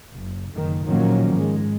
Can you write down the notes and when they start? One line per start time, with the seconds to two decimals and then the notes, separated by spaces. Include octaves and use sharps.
0.14 F#1
0.53 F#1 D#3
0.86 A#2 D#3 F3 F#3 A#3 C#4
1.34 G#2 G#3